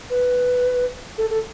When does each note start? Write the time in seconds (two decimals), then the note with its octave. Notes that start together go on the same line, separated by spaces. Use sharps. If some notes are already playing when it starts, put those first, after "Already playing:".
0.10 B4
1.18 A4
1.30 A4